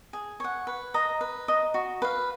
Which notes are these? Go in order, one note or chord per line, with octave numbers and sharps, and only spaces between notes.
G#4
C#5 F#5
B4
D#5 A#5
B4
D#5 A#5
F#4
B4 F5